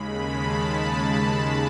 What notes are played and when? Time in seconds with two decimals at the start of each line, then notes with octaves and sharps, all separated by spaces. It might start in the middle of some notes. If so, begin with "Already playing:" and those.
Already playing: D#2 C#3 G#3 B5
0.27 A5
1.38 B5